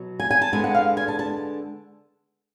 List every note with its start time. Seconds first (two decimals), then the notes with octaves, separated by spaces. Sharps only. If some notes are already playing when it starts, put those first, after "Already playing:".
Already playing: B2 F#3
0.20 G#5
0.31 G#5
0.42 A5
0.53 D3 G#3 B3 G#5
0.64 F#5
0.75 F5
0.97 G#5
1.08 A5
1.19 A5